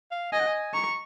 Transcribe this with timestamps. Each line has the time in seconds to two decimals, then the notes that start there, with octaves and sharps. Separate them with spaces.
0.11 F5
0.32 D#5 G#5
0.39 F#5
0.47 G#5
0.74 A#5 C#6